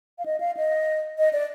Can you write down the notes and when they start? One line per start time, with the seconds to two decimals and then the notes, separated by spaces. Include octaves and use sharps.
0.18 F5
0.26 D#5
0.40 F5
0.57 D#5
1.18 D#5
1.33 D5